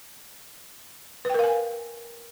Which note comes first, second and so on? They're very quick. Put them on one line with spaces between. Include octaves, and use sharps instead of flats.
B4 G5 A#4 F5 G#5